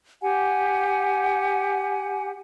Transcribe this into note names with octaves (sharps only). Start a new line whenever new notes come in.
G4 F#5 G#5